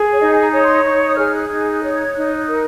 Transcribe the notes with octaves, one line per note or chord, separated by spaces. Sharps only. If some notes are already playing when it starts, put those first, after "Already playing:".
Already playing: G#4
C#5
D#4 D#5
A#5
C#5
C6
D#4 C#6
D#6
G#4 F6
F#6
D#4 G#6
F#6
C#5
G#6
D#4 F#6
A#4